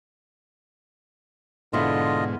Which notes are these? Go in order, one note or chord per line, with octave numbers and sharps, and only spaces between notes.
G#2 B2 D3 B3 E4 F4 C5 D#5